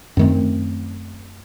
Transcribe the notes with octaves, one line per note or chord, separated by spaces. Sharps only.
F#2 D#3 A3 C4